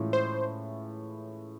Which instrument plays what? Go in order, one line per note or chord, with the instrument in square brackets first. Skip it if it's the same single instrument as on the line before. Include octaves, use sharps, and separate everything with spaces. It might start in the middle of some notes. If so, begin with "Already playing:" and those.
Already playing: [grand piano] A2 E3 G#3 C#4 F4
[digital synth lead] C5